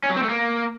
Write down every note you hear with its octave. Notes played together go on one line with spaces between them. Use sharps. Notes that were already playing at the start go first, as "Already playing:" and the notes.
C#4
F#3
C4
A3
A#3